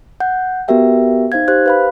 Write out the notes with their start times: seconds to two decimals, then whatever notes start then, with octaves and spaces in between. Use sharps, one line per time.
0.20 F#5 G6
0.68 B3 F#4 G4 A#4 E5 G5
1.32 D#4 C5 F5 G#6
1.48 G4 C5 F#6
1.66 B4 F5 B5